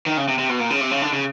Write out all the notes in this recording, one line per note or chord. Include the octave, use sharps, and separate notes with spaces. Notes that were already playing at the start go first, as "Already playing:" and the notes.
D#3
C#3
C3
C3
B2
A#2
C#3
C3
C#3
D3
C#3